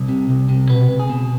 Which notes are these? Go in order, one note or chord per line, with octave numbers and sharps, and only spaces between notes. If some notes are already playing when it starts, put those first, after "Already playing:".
Already playing: C2
C3
C2
C3
B2 B4
C#2
G#4
B2